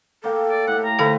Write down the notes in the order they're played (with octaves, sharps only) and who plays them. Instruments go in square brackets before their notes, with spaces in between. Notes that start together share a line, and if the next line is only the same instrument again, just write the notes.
[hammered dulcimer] A#3 F5 G5 [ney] A4
[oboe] D5
[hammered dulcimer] A2 G4 [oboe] F#5
[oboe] A#5
[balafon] D3 A4 F5 [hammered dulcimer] A3 B4 C5